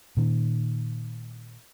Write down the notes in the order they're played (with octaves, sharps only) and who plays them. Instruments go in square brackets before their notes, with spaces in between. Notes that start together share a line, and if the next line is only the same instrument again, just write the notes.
[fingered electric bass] A#2 D#3